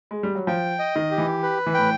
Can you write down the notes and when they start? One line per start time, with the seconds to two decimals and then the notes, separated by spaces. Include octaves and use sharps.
0.11 G#3
0.23 G3
0.35 F#3
0.47 F3 G5
0.79 D#5
0.96 D#3
1.11 G4
1.18 E3
1.43 B4
1.66 E3
1.74 A2 G5